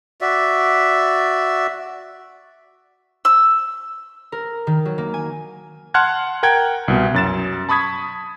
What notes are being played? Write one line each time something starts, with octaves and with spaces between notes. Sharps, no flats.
F#4 D5 E5
E6
A#4
D#3
F#3
A#3
G#5
F#5 A5 C6 F6 F#6 G#6
A#4 F#5 G5 G#6
C2 B2
F#2 A6 E7
A5 B5 C#6 D#6 G#6 B6